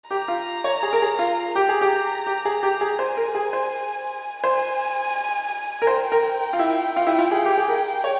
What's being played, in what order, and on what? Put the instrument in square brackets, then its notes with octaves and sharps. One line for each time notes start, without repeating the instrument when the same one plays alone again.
[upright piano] G4 [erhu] A#5
[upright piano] F4
C#5
G#4
A#4
G#4
F4
[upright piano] G4 [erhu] A#5
[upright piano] G#4
G4
G4
G#4
G4
G#4
[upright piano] C5 [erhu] G#5
[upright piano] A#4
G#4
C5
[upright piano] C5 [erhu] G#5
[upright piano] A#4
[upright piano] C5 [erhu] G5
[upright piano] A#4
F4
E4
F4
E4
F4
G#4
G4
G#4
A#4
C#5